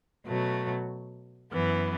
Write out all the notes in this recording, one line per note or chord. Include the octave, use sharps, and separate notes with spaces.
B2 F#3 A3
F#2 E3 B3